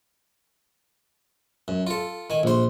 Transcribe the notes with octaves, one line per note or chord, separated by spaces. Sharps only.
F#2
F4 A4
D#3 G#5
A#1 C5